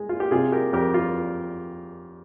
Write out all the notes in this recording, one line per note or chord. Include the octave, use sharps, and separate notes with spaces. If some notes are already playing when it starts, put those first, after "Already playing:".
Already playing: G#3
F4
G4
C3 F4 G#4
G4 A#4
F2 G4 A#4
F4